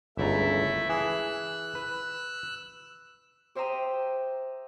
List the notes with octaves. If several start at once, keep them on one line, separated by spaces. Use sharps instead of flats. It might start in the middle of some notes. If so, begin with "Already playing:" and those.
G1 C#2 A3 E4 E5 A#5
E3 G#4 E6 F#6
B4
G4 C5 E5 G5 A#5 D#6